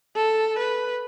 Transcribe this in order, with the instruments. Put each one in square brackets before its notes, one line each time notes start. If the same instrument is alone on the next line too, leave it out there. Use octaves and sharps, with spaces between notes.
[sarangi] A4
B4